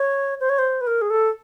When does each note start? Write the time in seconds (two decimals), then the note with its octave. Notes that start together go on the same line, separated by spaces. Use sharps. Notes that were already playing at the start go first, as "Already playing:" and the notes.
Already playing: C#5
0.40 C5
0.49 C#5
0.59 C5
0.81 B4
0.87 A#4
1.02 G#4
1.10 A4